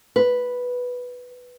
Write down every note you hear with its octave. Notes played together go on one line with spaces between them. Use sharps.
B4